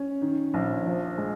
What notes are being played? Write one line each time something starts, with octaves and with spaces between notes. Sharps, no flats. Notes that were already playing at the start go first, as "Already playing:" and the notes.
Already playing: C#4
D#3
A#1
F3
G#3